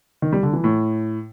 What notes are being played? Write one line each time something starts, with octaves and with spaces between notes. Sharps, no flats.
D#3
G3
D3
E3
A2